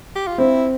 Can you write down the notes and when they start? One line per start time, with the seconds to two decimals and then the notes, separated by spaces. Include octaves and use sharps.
0.16 G4
0.27 F4
0.38 C4 E4